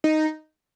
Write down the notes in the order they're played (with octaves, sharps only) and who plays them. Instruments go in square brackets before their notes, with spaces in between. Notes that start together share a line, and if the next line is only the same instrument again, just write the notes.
[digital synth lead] D#4